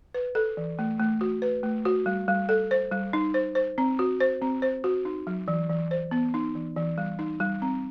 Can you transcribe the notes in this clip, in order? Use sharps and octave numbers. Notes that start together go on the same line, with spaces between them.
B4
A4
E3
A3
A3
F#4
B4
A3
F#4
G3
G3
A4
C5
G3
D#4
C5
C5
C4
F#4
C5
C4
C5
F#4
D#4
F#3
E3
E3
C5
B3
D#4
E3
E3
G3
D#4
G3
C4